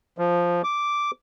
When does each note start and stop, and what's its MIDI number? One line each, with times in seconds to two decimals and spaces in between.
0.18 0.62 53
0.64 1.11 86